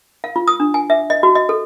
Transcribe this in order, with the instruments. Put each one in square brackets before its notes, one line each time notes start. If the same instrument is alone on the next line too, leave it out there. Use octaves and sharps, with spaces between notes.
[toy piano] F5
F4
D#6
D4
G#5
E5
D#5
F#4
D#5
A4